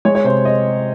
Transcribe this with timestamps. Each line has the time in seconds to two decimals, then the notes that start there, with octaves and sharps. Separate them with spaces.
0.05 G#3 C#5
0.15 C#5
0.24 C3 C5
0.45 D#5